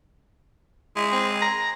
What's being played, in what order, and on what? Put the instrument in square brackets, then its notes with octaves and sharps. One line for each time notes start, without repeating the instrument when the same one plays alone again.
[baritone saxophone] G#3 [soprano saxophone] E4
[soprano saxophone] C4
A#5